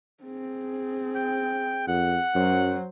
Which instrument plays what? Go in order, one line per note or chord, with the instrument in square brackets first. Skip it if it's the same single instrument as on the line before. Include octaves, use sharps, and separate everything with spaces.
[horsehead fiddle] C4 G#4
[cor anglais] G5
[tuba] F2 [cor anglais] F#5
[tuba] F#2 [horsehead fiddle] F#3 C5